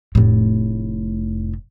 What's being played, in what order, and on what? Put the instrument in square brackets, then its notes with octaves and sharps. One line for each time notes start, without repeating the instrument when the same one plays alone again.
[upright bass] F1 A2